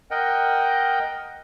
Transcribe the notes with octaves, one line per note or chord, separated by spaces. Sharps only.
A#4 D#5 F#5 G5